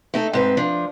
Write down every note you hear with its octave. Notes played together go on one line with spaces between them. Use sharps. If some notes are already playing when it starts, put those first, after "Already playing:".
A3 D#4 A4
G#2 C4 B4
F3 D4